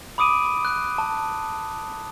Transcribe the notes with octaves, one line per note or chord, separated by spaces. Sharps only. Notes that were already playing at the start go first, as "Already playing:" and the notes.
B5 D6 D#6 D7 D#7
F#6
A5